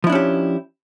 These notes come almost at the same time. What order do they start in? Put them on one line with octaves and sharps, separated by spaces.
F3 E4 D4 C#4 G4